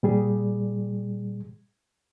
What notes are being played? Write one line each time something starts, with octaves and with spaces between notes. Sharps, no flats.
A#2 G3 G#4